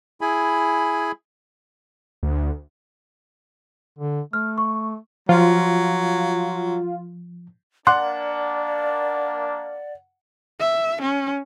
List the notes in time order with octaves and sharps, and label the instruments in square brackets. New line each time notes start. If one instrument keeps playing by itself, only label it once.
[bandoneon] E4 G#4 G#5 B5
[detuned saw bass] D2
[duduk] D3
[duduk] A3 [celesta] F6
[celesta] C#6
[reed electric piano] F3 [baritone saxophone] F#3 [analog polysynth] F4
[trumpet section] A#3 D4 [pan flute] D5 [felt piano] F#5 [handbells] C6 D6 F#6
[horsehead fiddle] E5
C#4